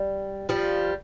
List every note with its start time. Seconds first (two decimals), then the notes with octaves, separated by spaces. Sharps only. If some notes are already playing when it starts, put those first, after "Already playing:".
Already playing: G3
0.49 F3 G3